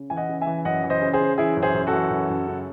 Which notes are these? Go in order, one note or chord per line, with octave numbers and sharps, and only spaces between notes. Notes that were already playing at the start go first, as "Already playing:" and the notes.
Already playing: C#3
E3 G#5
D#5 F#5
C#3
E5 G#5
E3
F#2 D#5 F#5
E3
C5 D#5
C#3
G#4 C5
C#3
E3 E4 G#4
F#2
G#4 C5
F#2
F#4 A4
E3
F#2
F#2
C#3